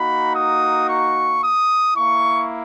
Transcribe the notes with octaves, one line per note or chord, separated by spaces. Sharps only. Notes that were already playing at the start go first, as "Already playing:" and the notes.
Already playing: A#3 D#4 F#4 B5
D#6
C#6
D#6
A#3 E4 C#6